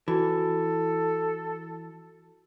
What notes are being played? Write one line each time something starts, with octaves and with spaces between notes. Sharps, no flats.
E3 F#4 A4